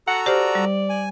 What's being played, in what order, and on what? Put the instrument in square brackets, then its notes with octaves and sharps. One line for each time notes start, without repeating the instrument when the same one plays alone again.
[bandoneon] F#4 A4 A#5 [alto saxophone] F#5
[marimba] G4 C5 F6 [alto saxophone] D5
[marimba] G3
[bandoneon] G#5